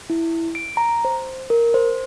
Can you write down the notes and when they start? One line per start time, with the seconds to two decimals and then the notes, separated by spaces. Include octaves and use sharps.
0.10 E4
0.55 D7
0.77 A#5
1.05 C5
1.50 A#4
1.74 C5